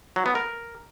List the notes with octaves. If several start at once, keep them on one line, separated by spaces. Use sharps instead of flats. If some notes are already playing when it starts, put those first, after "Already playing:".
F#3
B3
A#4